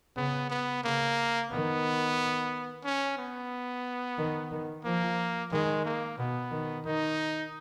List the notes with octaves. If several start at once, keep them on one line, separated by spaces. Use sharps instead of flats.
C#3 B3
B3
C#3 A#3
D#3 B3
C#4
B3
D#3
D#3
F3 A#3
D#3 G#3
A#3
B2 B3
D#3
D#3 D#4